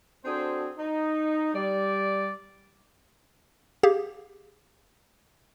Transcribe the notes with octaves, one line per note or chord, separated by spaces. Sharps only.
C4 D4 F#4 G#4 A4 C5
D#4
G3 D5
G4 G#4 F5